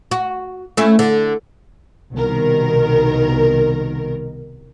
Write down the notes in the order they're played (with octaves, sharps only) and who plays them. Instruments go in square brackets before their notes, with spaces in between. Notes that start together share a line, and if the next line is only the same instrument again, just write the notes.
[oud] F#4
A3 C#4 E4
D3
[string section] C2 B2 D#3 A#4